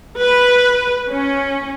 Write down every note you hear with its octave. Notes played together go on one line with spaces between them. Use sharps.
B4
C#4